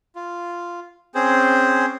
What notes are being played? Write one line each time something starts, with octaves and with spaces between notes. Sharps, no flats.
F4
C4 C#4 G#4 C5